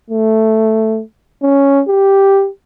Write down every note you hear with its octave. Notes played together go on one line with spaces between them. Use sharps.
A3
C#4
G4